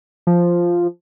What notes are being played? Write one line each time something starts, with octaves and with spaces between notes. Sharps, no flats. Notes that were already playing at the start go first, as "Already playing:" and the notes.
F3